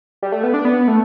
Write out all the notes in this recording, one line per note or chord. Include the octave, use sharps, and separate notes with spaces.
G3
A3
B3
D4
B3
A3